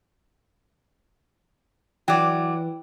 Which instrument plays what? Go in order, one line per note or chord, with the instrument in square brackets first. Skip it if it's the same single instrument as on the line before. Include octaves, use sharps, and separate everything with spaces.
[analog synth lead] E3 [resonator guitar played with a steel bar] F#3 D5 [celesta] G5